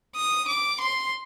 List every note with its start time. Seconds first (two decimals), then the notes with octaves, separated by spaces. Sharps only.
0.16 D#6
0.48 D6
0.81 C6